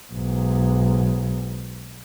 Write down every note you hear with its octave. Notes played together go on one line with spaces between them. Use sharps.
B1 G#2